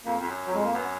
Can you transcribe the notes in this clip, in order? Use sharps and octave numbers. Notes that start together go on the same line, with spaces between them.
F2 A#3
F2
F#2
F#3
F2 G#3
A#3
F#2 B3